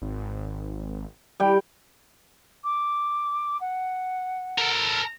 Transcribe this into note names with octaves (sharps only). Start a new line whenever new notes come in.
G#1
G3 G5
D6
F#5
A4 A#4